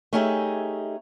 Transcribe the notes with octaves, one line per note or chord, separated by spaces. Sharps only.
A3 C#4 D#4 G4 G#4 E5